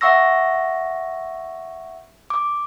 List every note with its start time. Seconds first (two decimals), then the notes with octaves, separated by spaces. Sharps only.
0.01 E5 F#5 C#6 E6 A#6
2.30 D6